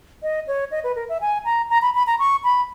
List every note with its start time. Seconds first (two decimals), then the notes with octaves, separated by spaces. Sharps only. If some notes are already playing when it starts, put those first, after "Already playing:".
0.23 D#5
0.47 C#5
0.71 D#5
0.84 B4
0.96 A#4
1.09 E5
1.21 G#5
1.45 A#5
1.70 A#5
1.82 B5
1.95 B5
2.07 A#5
2.19 C#6
2.44 B5